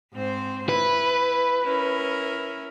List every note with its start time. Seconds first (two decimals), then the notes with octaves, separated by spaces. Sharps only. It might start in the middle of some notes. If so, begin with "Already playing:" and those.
0.13 G#2 C4 C5
0.69 E4 B4
1.64 C#4 E4 A#4